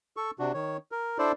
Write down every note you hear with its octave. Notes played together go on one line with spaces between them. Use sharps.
A4 C#6
C3 D4 F#4
D#3 C#5
A#4
D4 E4 A4 C5 D5